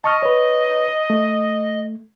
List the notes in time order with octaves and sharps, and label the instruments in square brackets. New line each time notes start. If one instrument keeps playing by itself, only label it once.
[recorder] D#5 [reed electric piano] A5 C#6 F6
[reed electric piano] B4 C#5
A3